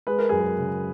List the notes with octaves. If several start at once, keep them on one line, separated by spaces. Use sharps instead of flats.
G#3 B4
A#4
F#2 G#4
A#4
C#3